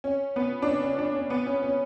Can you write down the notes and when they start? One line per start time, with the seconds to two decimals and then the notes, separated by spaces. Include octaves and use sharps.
0.04 C#4
0.36 B3
0.62 D4
0.67 C#4
0.83 C#4
0.99 D4
1.15 C#4
1.30 B3
1.46 C#4
1.63 C#4